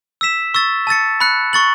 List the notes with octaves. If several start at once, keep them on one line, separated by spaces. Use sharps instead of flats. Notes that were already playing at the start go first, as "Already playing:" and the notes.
E6 B6 E7
C#6 E6 A6
A5 E6 A6 C#7
B5 F#6 C#7
C#6 A6 F#7